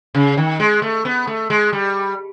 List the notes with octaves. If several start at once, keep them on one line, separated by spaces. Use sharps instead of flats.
C#3
D#3
G#3
A3
B3
A3
G#3
G3